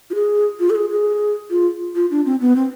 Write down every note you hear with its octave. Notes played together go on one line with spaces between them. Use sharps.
F4
G#4
F4
A4
G#4
G#4
F4
F4
D4
C4
B3
C4